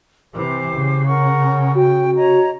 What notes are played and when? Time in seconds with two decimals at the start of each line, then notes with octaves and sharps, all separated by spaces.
0.33 C3 E3 G4 C5 D6
0.76 C#3
1.06 A#4 F#5 C#6
1.75 F#4 G5
2.16 C#5 D#5 A#5